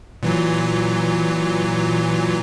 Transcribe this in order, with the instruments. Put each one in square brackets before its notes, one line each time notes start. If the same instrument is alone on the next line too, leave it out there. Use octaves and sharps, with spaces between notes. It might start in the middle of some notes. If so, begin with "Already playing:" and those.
[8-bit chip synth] A#2 E3 F#3